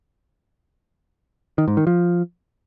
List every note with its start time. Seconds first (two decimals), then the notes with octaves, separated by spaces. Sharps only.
1.58 D#3
1.68 G#2
1.77 D#3
1.87 F3